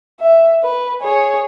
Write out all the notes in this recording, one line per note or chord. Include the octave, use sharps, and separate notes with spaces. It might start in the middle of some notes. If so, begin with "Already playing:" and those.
E5
B4
G#4 C#5